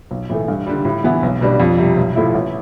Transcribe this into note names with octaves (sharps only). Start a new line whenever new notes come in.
B1
A2 E3 A3
G2
D3 G3
A2
E3 B3 E4
B1
B2 G3 D4
F2
C3 G3
B1
A2 F3 A3 E4
A1